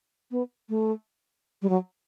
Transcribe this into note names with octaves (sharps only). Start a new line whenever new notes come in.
B3
A3
G3
F#3